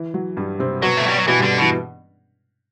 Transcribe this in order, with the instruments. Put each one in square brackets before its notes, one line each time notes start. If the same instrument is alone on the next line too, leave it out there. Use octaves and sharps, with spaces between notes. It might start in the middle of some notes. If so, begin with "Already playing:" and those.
Already playing: [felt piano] E3
F#3
G2 G3
C3 C4
[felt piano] B2 B3 [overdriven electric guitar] F#3
[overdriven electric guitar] A3
G3
F#3
[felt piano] B2 B3 [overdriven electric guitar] E3
[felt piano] G2 G3 [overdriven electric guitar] D3
[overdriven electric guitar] B2 [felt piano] E3